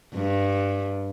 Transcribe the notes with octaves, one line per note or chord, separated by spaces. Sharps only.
G2